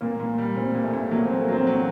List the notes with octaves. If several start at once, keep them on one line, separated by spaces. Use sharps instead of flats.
A#2 A#3
A#2
G3
A#2 C4
A#2
A3
A#2
F#3 A#3
C4
A3
A#3
F#3 C4
F#3 A#3